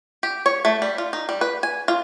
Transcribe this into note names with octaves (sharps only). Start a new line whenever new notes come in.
G4
C#5
A3
G3
F4
D#4
G3
B4
G#5
F4